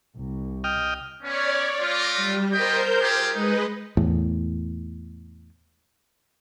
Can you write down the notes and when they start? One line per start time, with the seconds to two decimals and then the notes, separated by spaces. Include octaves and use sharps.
0.15 C2
0.64 D#5 G5 F6
1.23 B3 C#4 C#5 D5
1.80 A3 F4 D6 A#6
2.16 G3
2.52 B3 A#4 C5 D#5 G5 G6
3.00 F4 G4 G#4
3.34 G#3 D#4 B4 D#5
3.97 E2 A2